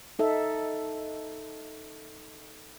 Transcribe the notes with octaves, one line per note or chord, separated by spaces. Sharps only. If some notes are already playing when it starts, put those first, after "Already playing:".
D#4 A4 E5